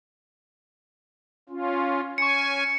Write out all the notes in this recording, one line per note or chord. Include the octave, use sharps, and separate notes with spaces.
C#4 F4
C#4 G#5 C#6 C#7